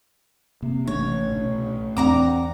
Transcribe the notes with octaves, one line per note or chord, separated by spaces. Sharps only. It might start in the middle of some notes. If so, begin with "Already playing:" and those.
C3 A#3 C4
A1 A2 C3 A3 C#4 D4 C#5
C2 B2 D4
E2 C4 D4 F#5 A#5 D6